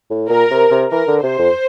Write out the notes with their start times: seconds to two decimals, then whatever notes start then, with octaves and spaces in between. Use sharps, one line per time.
0.10 A2
0.30 A#2 A#4
0.51 C3
0.71 C3
0.92 E3 A#4
1.08 D3
1.23 C3 C5
1.39 F2